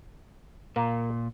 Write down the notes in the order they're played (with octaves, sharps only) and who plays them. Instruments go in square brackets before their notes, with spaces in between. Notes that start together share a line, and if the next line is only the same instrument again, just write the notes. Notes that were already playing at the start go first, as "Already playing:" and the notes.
[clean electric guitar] A#2 [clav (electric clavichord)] A#3